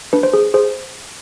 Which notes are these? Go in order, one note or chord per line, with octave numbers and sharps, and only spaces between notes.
D4 B4
C5
G#4
G#4 C5